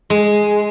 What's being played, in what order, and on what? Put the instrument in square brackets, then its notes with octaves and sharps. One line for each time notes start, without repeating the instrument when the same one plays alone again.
[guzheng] G#3